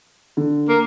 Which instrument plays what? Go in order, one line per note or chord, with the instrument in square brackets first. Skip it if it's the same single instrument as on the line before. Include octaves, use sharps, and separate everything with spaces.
[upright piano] D3
[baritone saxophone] A#3